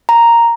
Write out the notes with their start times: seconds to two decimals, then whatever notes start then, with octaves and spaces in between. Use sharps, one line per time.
0.09 A#5